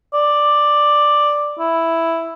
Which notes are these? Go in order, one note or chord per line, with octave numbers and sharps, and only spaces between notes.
D5
E4